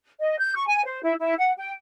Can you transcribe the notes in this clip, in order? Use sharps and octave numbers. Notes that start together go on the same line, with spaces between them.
D#5
G6
C#6
G#5
C5
E4
E4
F#5
G5